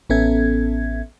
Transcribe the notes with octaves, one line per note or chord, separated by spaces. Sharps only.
A1 B3 C#4 A4 E5 G#6